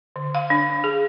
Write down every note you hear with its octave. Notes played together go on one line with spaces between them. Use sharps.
D3
F5
D4
G#4